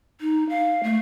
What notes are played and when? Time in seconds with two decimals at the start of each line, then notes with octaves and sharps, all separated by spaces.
0.21 D#4
0.49 F5
0.83 A3